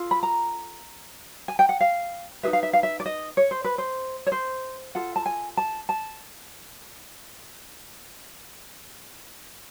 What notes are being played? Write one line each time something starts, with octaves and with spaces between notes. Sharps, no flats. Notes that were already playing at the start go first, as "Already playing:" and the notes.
Already playing: F4 A4
B5
A#5
G#5
G5
F#5
F5
D#4 G#4 B4 E5
F5
E5
F5
E5
D5
D#5
C#5
C5
B4
C5
C#5
C5
F4 A4 F#5
A5
G#5
A5
A5